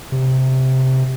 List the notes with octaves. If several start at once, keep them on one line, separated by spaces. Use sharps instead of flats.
C3